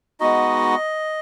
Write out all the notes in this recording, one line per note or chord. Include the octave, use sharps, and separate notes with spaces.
G#3 B3 D#4 F#4 D#5